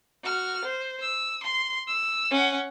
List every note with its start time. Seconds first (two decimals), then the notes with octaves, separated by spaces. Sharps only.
0.24 F#4 F6
0.65 C5
1.02 E6
1.43 C6
1.87 E6
2.31 C#4 F#5